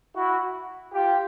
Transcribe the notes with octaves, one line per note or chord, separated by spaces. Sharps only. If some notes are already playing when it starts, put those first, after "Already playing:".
E4 F#4
F4 G4